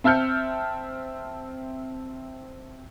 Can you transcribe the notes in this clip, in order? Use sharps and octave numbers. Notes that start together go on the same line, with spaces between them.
C4 E5 A5 F6 G6 C#7